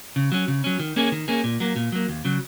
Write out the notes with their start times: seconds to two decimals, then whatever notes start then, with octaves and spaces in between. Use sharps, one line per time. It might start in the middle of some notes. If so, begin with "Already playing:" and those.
0.16 C#3
0.32 F#3 C#4
0.48 C#3
0.64 F#3 C#4
0.79 D#3
0.96 A#3 C#4 G#4
1.12 D#3
1.28 A#3 C#4 G#4
1.44 A#2
1.60 F#3 A#3
1.76 A#2
1.92 F#3 A#3
2.08 D#2
2.25 C#3 F#3